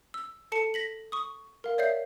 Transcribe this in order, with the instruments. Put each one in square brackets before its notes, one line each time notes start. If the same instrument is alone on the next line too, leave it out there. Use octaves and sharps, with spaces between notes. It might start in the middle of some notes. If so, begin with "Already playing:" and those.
[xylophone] E6
A4 A5 C#7
A#6 B6 F#7
C#6 D#6
A#4 F5
C#5 D5 E5 G6 C7